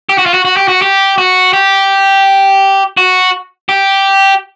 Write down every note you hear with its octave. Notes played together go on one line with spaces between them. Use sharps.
G4
F#4
F4
F#4
F#4
G4
F#4
G4
F#4
G4
F#4
G4